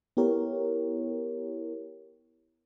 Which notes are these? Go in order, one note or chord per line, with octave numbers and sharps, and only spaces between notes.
B3 E4 G4 A#4 C#5